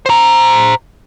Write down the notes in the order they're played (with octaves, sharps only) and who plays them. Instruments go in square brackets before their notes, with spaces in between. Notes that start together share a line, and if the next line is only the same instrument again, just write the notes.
[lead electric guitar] C5 A#5